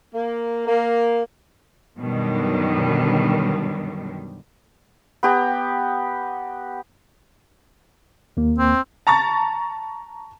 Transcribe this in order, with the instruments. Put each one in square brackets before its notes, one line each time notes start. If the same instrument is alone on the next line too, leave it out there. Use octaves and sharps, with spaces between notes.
[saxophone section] A#3
A#3
[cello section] F#2 B2 D3 D#3 F#3 G3
[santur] B3 G4 A#5
[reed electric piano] D#2 A#3
[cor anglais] C4
[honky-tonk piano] A5 A#5 C#6 A6